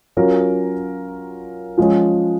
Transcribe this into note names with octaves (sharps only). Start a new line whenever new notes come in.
F#3 C#4 F4 A#4
F3 G#3 C#4